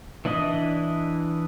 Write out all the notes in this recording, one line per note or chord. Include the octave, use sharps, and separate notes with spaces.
E3 D4 E4 D#5